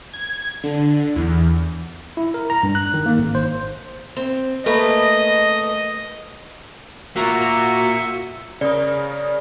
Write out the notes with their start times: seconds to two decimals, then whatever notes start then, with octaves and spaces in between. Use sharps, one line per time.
0.13 G#6
0.64 D3
1.16 E2
2.17 E4
2.34 A#4
2.50 A#5
2.63 G2
2.75 F#6
2.94 D#3
3.06 A#3
3.19 G#1
3.35 C5
4.16 C4
4.66 A3 A#3 B4 D#5
7.16 A#3 F4 F#4 E5 A#5 C#6
8.61 C#3 A#4 D5 D#6